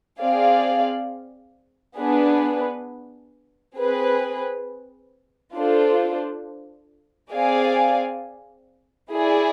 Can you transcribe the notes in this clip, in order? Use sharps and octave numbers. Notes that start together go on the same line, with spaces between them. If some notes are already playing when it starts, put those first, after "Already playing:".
C4 G#4 D5 F5
B3 D4 G#4 B4
C4 G#4 B4
D4 F4 A4 C5
C4 G#4 D5 F5 G#5
E4 G#4 D5